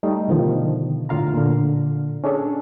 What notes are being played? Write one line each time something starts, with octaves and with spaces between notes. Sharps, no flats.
G3 A3 D#4
B2 D3 D#3 F3
A2 D3 F4 F5 A#5
A#2 D3
C#4 D4 G#4 A4